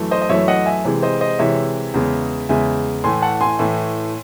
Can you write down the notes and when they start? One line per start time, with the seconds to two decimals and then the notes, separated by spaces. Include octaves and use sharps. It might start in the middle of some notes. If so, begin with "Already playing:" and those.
Already playing: F#2 E3 A3
0.11 C5 D#5
0.22 D#5
0.29 F#2 E3 A3 C#5 E5
0.48 D#5 F#5
0.66 E5 G#5
0.85 C3 E3 G#3
1.03 C5 D#5
1.21 C5 D#5
1.39 C3 E3 G#3 C#5 E5
1.94 E2 C#3 G#3
2.49 E2 C#3 G#3 E5 G#5
3.04 A2 E3 A3 G#5 C6
3.22 F#5 A5
3.41 G#5 C6
3.59 A2 E3 A3